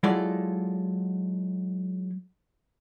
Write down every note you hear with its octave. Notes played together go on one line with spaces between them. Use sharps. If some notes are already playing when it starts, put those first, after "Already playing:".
F#3 G#3 E4 F4 A4 D5